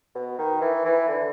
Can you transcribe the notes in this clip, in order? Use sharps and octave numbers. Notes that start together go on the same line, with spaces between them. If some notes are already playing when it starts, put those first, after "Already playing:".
B2
D#3
E3
E3
D3